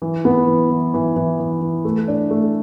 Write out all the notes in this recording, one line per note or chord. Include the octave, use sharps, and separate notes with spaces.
E3
B3
E3
E3
E3
E3
E3
E3
A3
D4
A3